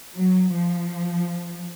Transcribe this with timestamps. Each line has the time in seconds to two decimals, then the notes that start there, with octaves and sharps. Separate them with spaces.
0.15 F#3
0.53 F3